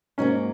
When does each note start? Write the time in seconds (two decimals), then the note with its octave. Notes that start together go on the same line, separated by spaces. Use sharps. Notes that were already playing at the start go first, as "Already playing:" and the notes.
0.18 G#2 F#3 A#3 C#4